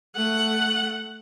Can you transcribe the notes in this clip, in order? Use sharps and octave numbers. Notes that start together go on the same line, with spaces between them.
A3 F#5